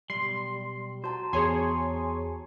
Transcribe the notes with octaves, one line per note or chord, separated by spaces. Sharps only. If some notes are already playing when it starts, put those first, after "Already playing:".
B1 E2 G3 C6 C7
F#4 C5 A5 A#5
E2 G#4 C#5 G#5 C6